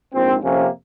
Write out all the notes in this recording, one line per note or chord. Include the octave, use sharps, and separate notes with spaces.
A#1 G#2 F3 C4
F2 C3 F3 A#3 C#4